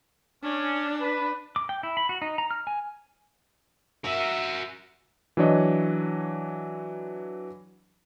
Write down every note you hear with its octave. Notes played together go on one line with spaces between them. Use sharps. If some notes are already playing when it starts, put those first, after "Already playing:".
C#4 D4
B4
D6
G5
E4
B5
F#4
D#4
A#5
F6
G#5
F#4 A#4 E5
E3 F#3 D4 C#5 D#5